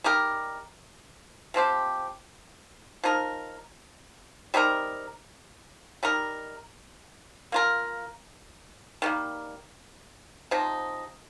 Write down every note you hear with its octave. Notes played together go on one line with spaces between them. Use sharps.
G3 D#4 G4 A#4
C3 F3 C4 G4
F3 D#4 A#4
G3 C4 D#4 A#4
G3 D#4 A#4
A#3 F4 A#4
D#3 G3 A#3
C3 F3 D#4